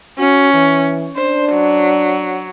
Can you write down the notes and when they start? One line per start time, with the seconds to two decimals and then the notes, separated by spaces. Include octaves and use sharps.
0.19 C#4 F#4
0.53 E3
1.16 D4 C5
1.53 F#3